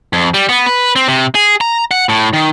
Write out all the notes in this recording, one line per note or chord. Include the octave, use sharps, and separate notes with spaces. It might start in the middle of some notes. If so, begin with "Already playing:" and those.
F2
G3
B3
B4
C4
C3
G#4
A#5
F#5
A2
D#3